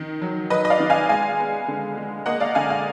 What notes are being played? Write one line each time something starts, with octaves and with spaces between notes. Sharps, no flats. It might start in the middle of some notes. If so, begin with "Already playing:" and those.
Already playing: D#3
F#3
F#3 B4 D#5
D#5
D5 F5
D#3
F5 G#5
G#3 F5 G#5
B3
D3
G#3
A#3 D#5 F#5
D5 F5
D3 F5 G#5
F5 G#5